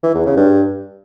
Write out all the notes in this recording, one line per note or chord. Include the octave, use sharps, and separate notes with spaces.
E3
E2
C#3
G2